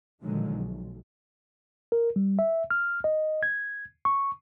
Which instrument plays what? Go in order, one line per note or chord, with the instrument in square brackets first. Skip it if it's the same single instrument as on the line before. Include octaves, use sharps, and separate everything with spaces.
[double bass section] A#2 D3 D#3 F3 F#3 G#3
B1
[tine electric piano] A#4
G3
E5
F6
D#5
G#6
C#6